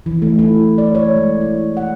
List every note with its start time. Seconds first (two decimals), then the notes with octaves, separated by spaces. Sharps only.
0.06 E3
0.22 A3
0.39 E4
0.78 D5
0.95 C#5
1.16 G#3
1.41 E4
1.77 F#5